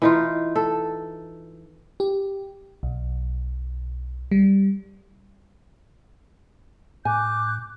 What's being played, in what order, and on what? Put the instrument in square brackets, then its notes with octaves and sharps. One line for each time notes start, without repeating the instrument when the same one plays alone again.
[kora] E3 D#4 F4
A4
[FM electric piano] G4
B1
G3
[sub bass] A2 [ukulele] G#5 [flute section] D6 F#6 G6